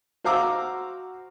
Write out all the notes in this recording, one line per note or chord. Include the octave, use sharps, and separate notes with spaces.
F#4 C5 F5 A#5 D6 E6